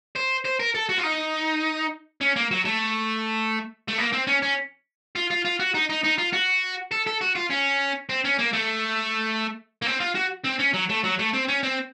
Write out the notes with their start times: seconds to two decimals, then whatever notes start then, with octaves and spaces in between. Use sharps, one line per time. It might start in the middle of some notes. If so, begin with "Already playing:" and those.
0.16 C5
0.45 C5
0.59 A#4
0.74 A4
0.89 F#4
0.98 F4
1.03 D#4
2.21 C#4
2.36 A#3
2.51 F#3
2.65 A3
3.88 A3
3.98 A#3
4.12 C4
4.27 C#4
4.42 C#4
5.16 F4
5.30 F4
5.45 F4
5.60 F#4
5.74 D#4
5.89 D#4
6.04 D#4
6.18 F4
6.33 F#4
6.92 A4
7.07 A4
7.21 F#4
7.36 F4
7.50 C#4
8.09 C4
8.25 C#4
8.39 A#3
8.53 A3
9.82 A#3
9.86 C4
10.00 F4
10.15 F#4
10.45 C4
10.60 C#4
10.74 F#3
10.90 A3
11.04 F#3
11.19 A3
11.33 C4
11.48 C#4
11.63 C4